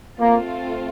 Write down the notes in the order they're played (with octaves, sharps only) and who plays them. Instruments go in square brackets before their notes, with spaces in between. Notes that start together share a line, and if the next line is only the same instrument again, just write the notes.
[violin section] A3 C4 F4 [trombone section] A#3